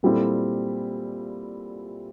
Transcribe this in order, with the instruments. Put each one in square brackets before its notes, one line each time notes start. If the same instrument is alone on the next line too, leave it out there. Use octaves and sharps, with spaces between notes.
[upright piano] A#2 G3 C4 E4 A4